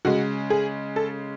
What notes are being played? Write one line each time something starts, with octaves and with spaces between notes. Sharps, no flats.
C#3 G#3 F#4
G#4
A4